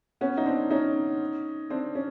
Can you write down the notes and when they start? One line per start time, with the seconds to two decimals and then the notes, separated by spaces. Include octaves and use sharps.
0.21 B3 C#4
0.37 D#4
0.46 C4 D4
0.71 C#4 D#4
1.70 C4 D4
1.95 C#4